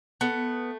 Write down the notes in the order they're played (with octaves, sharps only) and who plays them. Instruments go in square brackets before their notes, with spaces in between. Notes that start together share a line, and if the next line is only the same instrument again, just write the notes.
[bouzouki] A3 B3